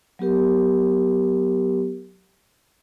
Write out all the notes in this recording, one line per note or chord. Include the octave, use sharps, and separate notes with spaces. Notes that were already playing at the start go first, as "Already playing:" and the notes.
F#3 B3 G4 A#4